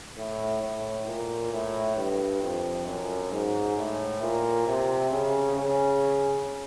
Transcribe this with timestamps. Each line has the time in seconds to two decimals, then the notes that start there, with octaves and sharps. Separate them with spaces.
0.18 A2
0.62 A2
1.07 A#2
1.52 A2
1.97 G2
2.42 F2
2.86 F#2
3.31 G#2
3.76 A2
4.21 A#2
4.66 C3
5.11 C#3
5.56 C#3